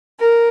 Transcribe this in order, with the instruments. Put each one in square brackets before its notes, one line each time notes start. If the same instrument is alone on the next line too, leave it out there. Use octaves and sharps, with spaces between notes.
[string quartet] A#4